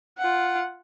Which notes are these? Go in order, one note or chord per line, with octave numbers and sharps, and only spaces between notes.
F4 F#5